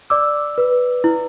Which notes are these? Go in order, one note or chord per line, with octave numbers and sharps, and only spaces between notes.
D5 D6 E6
B4
E4